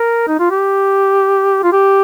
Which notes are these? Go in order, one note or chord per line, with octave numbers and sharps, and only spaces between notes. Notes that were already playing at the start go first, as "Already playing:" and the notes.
Already playing: A#4
D#4
F4
G4
F4
G4